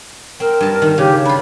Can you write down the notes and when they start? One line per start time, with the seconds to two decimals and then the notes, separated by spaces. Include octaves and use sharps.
0.40 C4 A#4
0.61 G2 A5
0.82 D#3
0.98 C#3 G4
1.25 D4 F4 B5